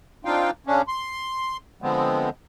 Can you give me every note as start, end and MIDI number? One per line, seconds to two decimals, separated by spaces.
0.25 0.51 60
0.25 0.51 62
0.25 0.51 63
0.25 0.51 65
0.25 0.51 77
0.25 0.51 79
0.67 0.82 49
0.67 0.82 61
0.67 0.82 62
0.88 1.57 84
1.82 2.30 50
1.82 2.30 53
1.82 2.30 56
1.82 2.30 59
1.82 2.30 60